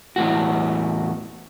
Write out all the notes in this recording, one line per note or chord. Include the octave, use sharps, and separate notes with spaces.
E2 A2 F#4